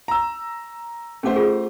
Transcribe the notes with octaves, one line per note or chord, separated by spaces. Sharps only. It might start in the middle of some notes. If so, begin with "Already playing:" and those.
A#5 E6
A3 C#4 G4 C5 F#5
F4 G#4